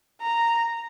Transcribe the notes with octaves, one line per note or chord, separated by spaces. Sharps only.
A#5